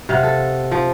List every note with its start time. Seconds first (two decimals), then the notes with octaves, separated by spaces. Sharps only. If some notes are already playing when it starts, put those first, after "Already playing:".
0.09 C3 F5 F#5
0.23 A4
0.71 F3